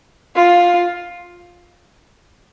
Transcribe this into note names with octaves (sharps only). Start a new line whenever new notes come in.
F4